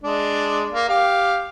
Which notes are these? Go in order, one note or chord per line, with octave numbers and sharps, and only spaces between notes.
G#3 D4
A#3
G4 F5